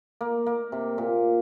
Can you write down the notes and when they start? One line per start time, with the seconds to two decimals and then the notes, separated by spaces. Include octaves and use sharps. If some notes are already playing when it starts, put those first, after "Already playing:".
0.21 A#3
0.46 A#3
0.72 C3
0.98 A#2